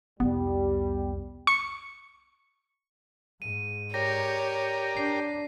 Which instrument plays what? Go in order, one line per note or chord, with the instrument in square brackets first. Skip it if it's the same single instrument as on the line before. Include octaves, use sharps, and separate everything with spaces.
[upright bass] C2 F2 [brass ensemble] G3 [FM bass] B3
[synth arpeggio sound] C#6
[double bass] G#2 [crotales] D#7
[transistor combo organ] G4 A#4 D5 [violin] C#5 [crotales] A#6
[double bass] D4 [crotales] C7